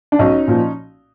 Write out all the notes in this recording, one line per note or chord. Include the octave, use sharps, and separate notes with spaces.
D4
B1 C#4 D#4
A#2 F3